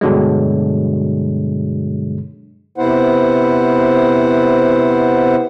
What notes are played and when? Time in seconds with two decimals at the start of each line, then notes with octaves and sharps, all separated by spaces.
0.01 G2 B2 D3 F#3 G#3
2.78 C3 B3 E4 C5 F#5